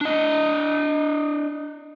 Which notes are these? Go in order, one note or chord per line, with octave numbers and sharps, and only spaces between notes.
D4 D#5